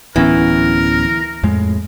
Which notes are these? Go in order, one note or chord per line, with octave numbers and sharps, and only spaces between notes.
D1 E3 B3 C#4 A#4
F2 A2 G#3